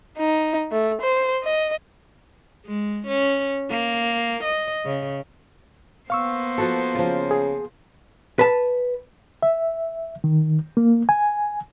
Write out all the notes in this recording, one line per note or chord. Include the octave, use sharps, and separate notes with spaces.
D#4
A3
C5
D#5
G#3
C#4
A#3
D#5
C#3
A#3 B3 C5 F5 C#6 E6
F3 F#4 A4
C#3 F3 F4
G#4
B4 A5
E5
D#3
A#3
G#5